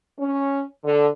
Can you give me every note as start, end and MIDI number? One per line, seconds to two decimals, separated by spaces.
0.18 0.63 61
0.84 1.07 50